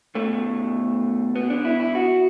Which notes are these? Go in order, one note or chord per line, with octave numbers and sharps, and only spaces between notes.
B1 B2 A3
B3
D4
E4
E4
F#4